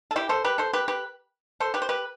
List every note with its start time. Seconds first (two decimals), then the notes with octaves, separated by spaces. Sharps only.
0.11 A4
0.16 E4 G4
0.29 A4 C5
0.44 G4 B4
0.58 A4 C5
0.73 G4 B4
0.88 G4 B4
1.60 A4 C5
1.74 G4 B4
1.82 C5
1.89 G4 B4